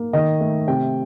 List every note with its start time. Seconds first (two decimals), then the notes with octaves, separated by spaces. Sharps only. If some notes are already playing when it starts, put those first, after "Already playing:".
Already playing: A#3
0.13 D#3 D#5
0.40 A3
0.67 C3 G5